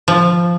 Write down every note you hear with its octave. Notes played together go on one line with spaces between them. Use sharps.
F3